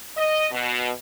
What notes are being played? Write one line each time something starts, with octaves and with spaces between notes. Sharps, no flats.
D#5
B2